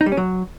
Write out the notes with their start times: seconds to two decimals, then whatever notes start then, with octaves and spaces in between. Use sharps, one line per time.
0.01 D#4
0.06 G3
0.12 C#4
0.17 F#3